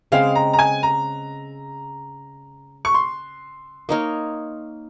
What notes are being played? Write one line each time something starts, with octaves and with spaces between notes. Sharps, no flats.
C#3 G#3 C4 F5
A#5
A#5
G#5
A#5
C#6
C6
A#3 D#4 A#4 C#5